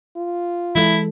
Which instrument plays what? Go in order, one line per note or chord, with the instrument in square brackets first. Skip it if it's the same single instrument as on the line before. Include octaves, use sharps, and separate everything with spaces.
[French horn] F4
[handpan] E3 G#3 A4 [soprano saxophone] E4